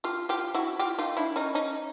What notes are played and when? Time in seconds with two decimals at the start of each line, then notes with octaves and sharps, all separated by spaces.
0.04 F4 G4
0.29 F4 G4
0.54 E4 F#4
0.79 F4 G4
0.98 D#4 F4
1.17 D4 E4
1.36 C#4 D#4
1.55 C#4 D#4